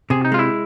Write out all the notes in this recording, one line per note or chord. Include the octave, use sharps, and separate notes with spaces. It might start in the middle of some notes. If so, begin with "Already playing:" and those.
C3 G#4
D#4
G#3 F4
E4